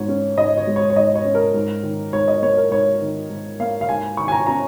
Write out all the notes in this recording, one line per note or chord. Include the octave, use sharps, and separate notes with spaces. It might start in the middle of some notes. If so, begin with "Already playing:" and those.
Already playing: G#2 G#3 C#5
C#4
G#2 D#5
C#5
G#3
C#5
C#5
G#2 D#5
C#5
C#4
A#4
G#2
D#3
G#2 C#5
D#5
A#3 C#5
A#4
G#2 C#5
D#3
G#2
A#3 F5
F5
G#2 G#5
D#3 C#6
G#5
A#5
C#4 A#5